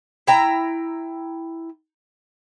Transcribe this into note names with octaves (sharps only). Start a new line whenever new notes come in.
E4 G5 A#5